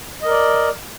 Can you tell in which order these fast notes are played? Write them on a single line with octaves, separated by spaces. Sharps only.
D#5 A#4 D5